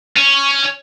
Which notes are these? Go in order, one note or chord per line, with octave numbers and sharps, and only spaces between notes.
C#4